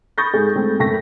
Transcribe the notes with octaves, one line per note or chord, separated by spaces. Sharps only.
B5 C#6 D#6 G6 A6 A#6
G#2 G#4 A4
G#3 A3 C4
F#1 A3 G5 C#6 A#6 B6